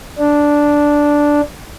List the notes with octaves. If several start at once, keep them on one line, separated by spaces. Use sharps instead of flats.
D4